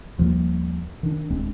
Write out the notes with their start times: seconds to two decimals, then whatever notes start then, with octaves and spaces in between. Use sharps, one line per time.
0.18 D#2 F3 G3 A#3
1.03 D#3 D4
1.30 D1 G#3 C4 D4